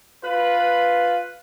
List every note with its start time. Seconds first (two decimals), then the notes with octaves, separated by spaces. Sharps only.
0.23 F4 B4